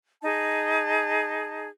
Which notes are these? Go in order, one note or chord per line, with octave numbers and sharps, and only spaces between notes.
D#4 G#4 A5